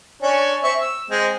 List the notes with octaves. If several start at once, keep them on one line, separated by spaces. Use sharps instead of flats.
C#4 D4 C#5
C4 E5 C#6
E6
G#3 C4